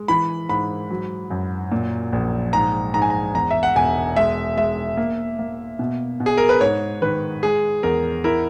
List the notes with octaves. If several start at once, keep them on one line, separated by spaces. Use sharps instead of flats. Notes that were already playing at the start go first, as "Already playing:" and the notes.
Already playing: G#3
E3 B5
G#2 B5
F#3
F#2
A#2
A#1
G#2 A#5
G#2 A#5
G#5
A#5
E2 A#5
E5
F#5
E1 G#5
G#3 E5
G#3 E5
A#3
A#3
B2
B2
G#4
A#4
B4
G#2 C#5
D#3 B4
G#3 G#4
E2 A#4
E4 A#4